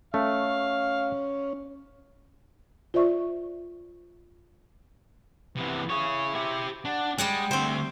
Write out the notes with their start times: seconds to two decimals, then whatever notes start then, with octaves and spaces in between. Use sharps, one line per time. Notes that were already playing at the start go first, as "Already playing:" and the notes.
0.14 A3 C#4 F5
2.94 F4 C5 D5 E5 C#6
5.56 C3 E3 B3
5.90 E4 G#4 C#5
6.35 G4 E5
6.85 D4 F#5
7.18 G3 G#3 D5 F#5 G5
7.51 D2 D3 C4 C5